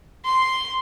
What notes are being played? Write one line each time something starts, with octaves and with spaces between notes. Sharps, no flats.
C6